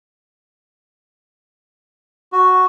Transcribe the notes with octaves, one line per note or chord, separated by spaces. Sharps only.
F#4